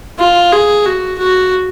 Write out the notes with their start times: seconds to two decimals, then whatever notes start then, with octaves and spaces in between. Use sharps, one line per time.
0.19 F4
0.52 G#4
0.85 F#4
1.18 F#4